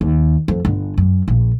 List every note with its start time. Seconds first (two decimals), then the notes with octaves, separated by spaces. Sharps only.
0.01 D#2
0.48 F2
0.65 G1 D3
0.98 F#2
1.28 A#1